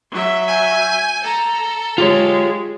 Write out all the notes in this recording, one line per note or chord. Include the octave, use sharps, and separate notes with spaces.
F#3 E5
G#5 G6
A4 A#5
G#3 F4 G4 C#5